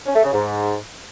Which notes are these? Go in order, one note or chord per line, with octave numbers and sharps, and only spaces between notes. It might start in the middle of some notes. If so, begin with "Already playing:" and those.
C#4
A3
C#3
G#2